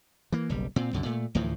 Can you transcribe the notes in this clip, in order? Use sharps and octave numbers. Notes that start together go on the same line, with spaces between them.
E3 A#3
F#1 B1 G3
A#2 C4
C2 F#2 D3
A#2 A3
D2 A2 E3 F3